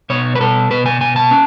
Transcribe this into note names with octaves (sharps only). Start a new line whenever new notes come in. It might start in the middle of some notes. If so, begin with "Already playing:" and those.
B2 C#5
B4
B2 A4
B2 B4
G#5
B2 G#5
A5
C#4